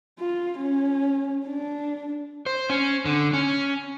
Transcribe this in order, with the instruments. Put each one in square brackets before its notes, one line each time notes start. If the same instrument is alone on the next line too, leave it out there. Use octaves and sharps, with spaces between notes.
[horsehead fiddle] F4
C#4
D4
[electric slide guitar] C5
C#4
D3
C#4